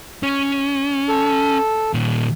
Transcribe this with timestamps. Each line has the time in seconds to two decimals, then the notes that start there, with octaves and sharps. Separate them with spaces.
0.23 C#4
1.08 A4
1.94 A#2 D#3